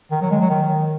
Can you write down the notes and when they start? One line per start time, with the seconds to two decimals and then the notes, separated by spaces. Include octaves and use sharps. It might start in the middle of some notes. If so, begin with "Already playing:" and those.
0.11 D#3
0.21 F#3
0.31 G#3
0.41 F#3
0.50 D#3